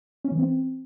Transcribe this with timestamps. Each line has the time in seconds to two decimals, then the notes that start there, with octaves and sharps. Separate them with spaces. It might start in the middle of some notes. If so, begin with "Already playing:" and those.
0.24 C#4
0.32 E3
0.39 C4